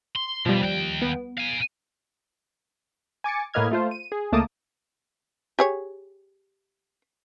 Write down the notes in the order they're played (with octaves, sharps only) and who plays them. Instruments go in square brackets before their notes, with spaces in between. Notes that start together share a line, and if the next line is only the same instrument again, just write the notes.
[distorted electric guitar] C6
[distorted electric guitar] B2 [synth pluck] F3 G3
[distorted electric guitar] D#2 G5
[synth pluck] B3
[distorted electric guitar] F5 G#5
[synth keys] G#5 D6 A6 C#7
A2 A#3 B4 D#5 F6 G#6
A3 F4 C5
D#7
G#4
C#2 A3 A#3 A5 D6 D#6
[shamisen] G4 G#4 C#5